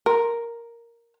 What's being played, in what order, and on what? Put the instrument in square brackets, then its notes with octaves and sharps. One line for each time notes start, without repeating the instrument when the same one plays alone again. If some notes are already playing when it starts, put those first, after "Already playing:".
[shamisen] A#4